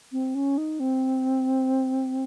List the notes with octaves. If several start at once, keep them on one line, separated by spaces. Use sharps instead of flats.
C4
C#4
D#4
C4